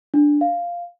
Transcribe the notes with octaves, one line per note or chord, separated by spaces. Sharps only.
D4
F5